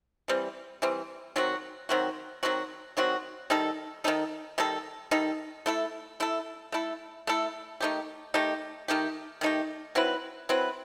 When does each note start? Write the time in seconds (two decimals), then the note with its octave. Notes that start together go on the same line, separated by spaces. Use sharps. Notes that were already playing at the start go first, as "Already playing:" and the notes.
0.28 E3 G3 C4
0.82 E3 G3 C4
1.36 D#3 F#3 C4 F#4
1.89 D#3 F#3 C4 F#4
2.43 D#3 F#3 C4 F#4
2.97 D#3 F#3 C4 F#4
3.50 D#3 G3 D#4 A4
4.04 D#3 G3 D#4 A4
4.58 D#3 G3 D#4 A4
5.11 D#3 G3 D#4 A4
5.66 A3 E4 A4
6.20 A3 E4 A4
6.72 A3 E4 A4
7.27 A3 E4 A4
7.80 D#3 A3 D#4 G4
8.34 D#3 A3 D#4 G4
8.88 D#3 A3 D#4 G4
9.41 D#3 A3 D#4 G4
9.95 F#3 C4 E4 B4
10.49 F#3 C4 E4 B4